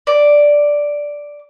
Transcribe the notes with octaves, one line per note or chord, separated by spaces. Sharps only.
D5